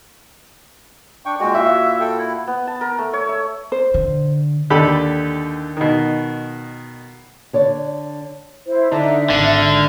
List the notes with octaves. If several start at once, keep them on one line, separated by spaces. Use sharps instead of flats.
D4 G5 C#6
A#2 G#3 F#4 G5
E4 F#4 E5 F5
A4 G5
E4
B3
A5
A#4
A3
C#5
E5
C5
D3
D#2 D3 G4 A4 B5
B2 D#3
D3 C#5 D5
E4 C5
D3 D4 D#4 E5
G#1 D3 F5